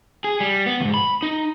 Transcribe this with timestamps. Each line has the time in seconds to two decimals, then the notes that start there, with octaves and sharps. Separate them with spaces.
0.24 G#4
0.40 G3
0.66 B3
0.80 D#2 G#2
0.94 B5
1.22 D#4